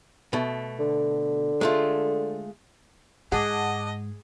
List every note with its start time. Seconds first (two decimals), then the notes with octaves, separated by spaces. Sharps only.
0.33 B2 A3
0.79 D3
1.61 G#3 A3 F4
3.32 G#2 G#4 D#5 F#5 A5 D6